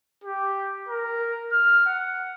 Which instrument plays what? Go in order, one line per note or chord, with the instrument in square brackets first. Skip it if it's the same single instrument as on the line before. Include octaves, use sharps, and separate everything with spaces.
[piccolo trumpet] G4
A#4
F6
F#5